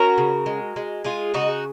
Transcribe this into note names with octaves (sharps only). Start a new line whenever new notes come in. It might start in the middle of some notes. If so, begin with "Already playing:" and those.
Already playing: C#4 F#4 A#4
C#3
G#3
G#3
G#3 F4 G#4
C#3 D#4 F#4